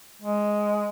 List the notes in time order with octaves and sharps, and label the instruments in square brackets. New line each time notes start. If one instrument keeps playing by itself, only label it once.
[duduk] G#3